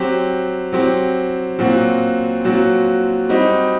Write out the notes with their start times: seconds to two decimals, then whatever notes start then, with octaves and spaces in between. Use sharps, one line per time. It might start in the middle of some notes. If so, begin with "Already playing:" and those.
Already playing: F#3 C4 G4
0.73 F#3 C4 G4
1.59 A#2 F#3 C4 F#4
2.44 A#2 F#3 C4 F#4
3.29 G3 C4 D#4 F#4